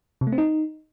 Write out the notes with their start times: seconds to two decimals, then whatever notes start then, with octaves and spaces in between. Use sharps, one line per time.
0.21 C3
0.27 A3
0.32 C4
0.38 D#4